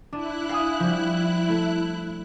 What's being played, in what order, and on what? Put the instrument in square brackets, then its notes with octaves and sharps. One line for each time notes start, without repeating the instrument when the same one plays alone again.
[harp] D4 D#7 [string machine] E4 F#6
[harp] F5 G#5 D#6
F3 G3
D7
A3